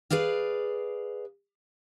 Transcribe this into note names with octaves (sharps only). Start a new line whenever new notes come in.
G#4 B4 D5 F5